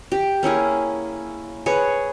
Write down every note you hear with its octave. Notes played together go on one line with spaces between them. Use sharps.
G4
A#3 C#4 E4 G#4
G#4 B4 C#5